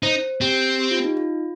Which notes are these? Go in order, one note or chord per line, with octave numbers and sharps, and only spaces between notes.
D#4 C5
C4 G4
G4
F4
D#4
F4